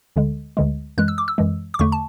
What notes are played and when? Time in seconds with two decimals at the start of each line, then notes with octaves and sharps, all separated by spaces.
0.16 D2 D3 G#3
0.57 D2 D3 G#3
0.98 F#2 E3 G#3 F#6
1.08 E6
1.18 D6
1.28 E6
1.38 F#2 E3 G#3
1.74 D6
1.79 E2 D3 A3 C#6
1.92 A5